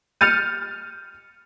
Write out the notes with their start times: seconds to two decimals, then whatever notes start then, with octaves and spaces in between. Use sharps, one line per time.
0.21 F6 G6 A6 C#7 D#7 F7